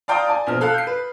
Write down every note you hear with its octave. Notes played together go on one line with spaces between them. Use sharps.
D5 F5 G5 A#5 C6 D#6
D5 G#5
A#1 B2 F6
A4 F5 F#6
G6 C7
B4